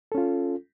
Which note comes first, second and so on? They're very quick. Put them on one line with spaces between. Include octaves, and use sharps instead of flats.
A4 C#4 F4